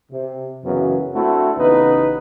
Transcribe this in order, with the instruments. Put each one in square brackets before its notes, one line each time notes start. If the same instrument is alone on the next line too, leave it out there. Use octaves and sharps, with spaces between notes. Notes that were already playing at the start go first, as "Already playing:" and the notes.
[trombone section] C3
F#2 C#3 E3 F#3 B3
A3 C4 D4 E4 F#4
A1 C#3 B3 D#4 B4